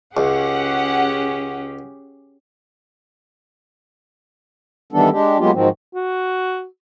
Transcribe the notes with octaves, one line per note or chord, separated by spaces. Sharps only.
C#2 C#4 G4 G#4 F#5
D#3 E3 G3 B3 D4 A4
G#3 D4 G4
F#3 G#3 A#3 B3 F4 G4
G#2 D#3 F3 F#3 C4
F#4